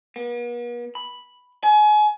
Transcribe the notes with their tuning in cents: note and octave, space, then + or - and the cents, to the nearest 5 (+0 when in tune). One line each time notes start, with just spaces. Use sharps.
B3 -45
B5 +0
G#5 +30